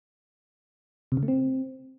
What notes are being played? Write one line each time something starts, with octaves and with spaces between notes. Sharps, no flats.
C3
C#3
A3
C4